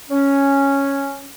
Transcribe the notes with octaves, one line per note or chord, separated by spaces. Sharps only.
C#4